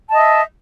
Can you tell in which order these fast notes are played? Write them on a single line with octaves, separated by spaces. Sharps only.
A5 D#5 E5